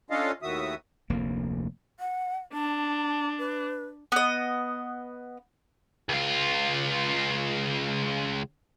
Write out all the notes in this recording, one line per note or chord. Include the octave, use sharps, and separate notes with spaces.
C#4 D4 F4 A4 D#5 F5
D#2 A2 D#3 F#4 E5 D#6
F1 D2 A#3
F#5
D4 A5
B4
B3 D#5
C#2 F4